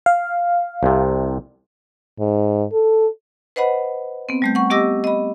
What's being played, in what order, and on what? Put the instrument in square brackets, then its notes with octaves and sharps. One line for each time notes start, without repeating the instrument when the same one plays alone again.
[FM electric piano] F5
[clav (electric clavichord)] C2 C3
[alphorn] G#2
A4
[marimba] B4 C5 D#5 F#5 B5
B3 C4
G3 A3 G6
F#5 C#6
B3 G4 D#5 D6 E6 A#6
D#5 B5